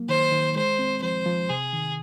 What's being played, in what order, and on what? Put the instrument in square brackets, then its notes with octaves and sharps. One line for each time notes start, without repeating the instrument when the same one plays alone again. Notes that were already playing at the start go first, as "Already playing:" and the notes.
Already playing: [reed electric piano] F#3 A#3
[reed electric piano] D#3 [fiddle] C5
[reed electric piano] D#3
[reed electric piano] G#3 [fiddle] C5
[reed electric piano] C4
[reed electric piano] F3 [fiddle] C5
[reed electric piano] F3
[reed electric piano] C3 [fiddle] G#4
[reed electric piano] D#3